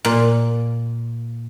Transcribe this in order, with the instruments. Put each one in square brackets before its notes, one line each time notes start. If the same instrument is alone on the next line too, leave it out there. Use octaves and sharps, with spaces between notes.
[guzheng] A#2